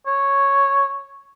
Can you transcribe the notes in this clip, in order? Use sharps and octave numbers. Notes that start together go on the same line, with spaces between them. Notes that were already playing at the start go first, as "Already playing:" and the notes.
C#5